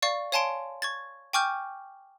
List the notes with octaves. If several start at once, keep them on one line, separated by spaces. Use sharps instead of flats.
D5 F5 C#6 A6
C#5 F5 G#5 A5 C6 D7
C#6 G#6 A6
G5 G#5 C#6 D6 F6 G6